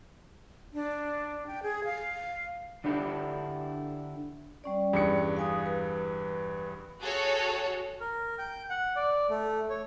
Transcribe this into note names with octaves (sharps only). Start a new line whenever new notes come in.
D4
G5
G#4
F5
D3 D4 E4 G4 A4
G3 C#4 D5
E2 G2 C#7
F5 G#5 D#6
B4
F#4 G#4 A4 C#5
A#4
G5
F#5
D5
A3
C#5